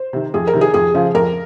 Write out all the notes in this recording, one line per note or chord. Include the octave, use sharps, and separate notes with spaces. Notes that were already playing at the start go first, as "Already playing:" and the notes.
Already playing: C5
C3 D#3
F2 G#4
A#4
C3 D#3
G#4
F2 G#4
C#3 F3
F2 A#4